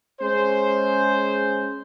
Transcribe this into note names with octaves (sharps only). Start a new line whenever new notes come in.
G#3 C#4 G#4 C5